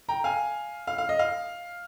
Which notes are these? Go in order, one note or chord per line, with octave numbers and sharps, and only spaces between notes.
G5 A#5
F5 G#5
F5
F5
D#5
F5